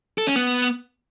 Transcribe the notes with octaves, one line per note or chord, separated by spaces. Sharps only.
A4
C#4
B3